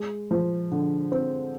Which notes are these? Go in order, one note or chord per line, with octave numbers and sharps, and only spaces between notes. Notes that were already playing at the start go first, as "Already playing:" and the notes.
Already playing: G#3
F3
D3
C4